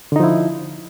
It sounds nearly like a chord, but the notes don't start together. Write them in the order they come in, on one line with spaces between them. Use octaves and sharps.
D3 D#4 F3 E4